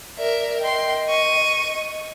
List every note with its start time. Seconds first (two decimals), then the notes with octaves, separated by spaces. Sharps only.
0.18 A#4 D5 E5
0.61 D#5 G5 C6
1.09 C#6 D#7